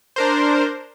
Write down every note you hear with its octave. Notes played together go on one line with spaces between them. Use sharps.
D4 A#4 C5